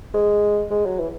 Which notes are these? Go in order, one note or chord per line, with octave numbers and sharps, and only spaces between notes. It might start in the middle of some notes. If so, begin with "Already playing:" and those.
G#3
G#3
F#3
E3